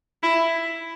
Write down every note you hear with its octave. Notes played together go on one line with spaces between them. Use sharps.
E4